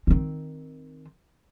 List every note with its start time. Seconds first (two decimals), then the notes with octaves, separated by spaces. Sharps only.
0.07 D#3 C4